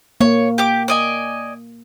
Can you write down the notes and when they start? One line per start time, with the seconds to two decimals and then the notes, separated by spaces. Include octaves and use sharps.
0.21 A#3 C#5
0.58 G4 D6
0.88 D5 D#5 G#5